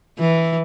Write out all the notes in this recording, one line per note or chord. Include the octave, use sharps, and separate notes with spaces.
E3